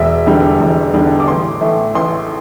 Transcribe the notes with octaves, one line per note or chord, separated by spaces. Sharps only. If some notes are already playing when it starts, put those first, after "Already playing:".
Already playing: E1 E5
E2 D3 G3
E1
E2 D3 G3
D6
A1 C6
A2 E3 A3
A1 C6